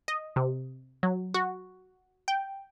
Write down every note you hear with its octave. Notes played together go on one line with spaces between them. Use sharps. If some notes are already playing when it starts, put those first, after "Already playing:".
D#5
C3
F#3
F#4
G5